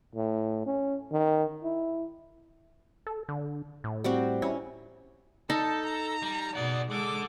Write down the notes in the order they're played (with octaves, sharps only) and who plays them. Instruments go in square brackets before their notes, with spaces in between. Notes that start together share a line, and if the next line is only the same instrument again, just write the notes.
[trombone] A2
C#4
D#3
E4
[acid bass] A4
D3
A2
[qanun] G3 C4 F#4
[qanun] C#4 [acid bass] E4
[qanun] D#4 [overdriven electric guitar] A4 [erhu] A5
[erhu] A#5
[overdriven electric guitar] G3
[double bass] B2 [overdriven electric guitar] G#4 F#5 [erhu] D5
[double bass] G#3 [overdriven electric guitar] A4 F#5 [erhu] D6